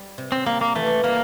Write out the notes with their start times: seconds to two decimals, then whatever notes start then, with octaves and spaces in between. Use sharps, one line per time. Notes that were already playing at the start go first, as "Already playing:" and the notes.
Already playing: G3
0.18 C3
0.32 C4
0.46 G3 A#3
0.61 A#3
0.75 E3 A3
1.04 G3 A#3